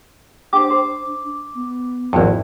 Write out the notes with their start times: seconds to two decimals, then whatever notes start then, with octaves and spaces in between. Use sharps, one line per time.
0.53 D4 G4 C5 D6
0.70 C5
1.54 B3
2.13 G#1 F2 D4 E4 F#4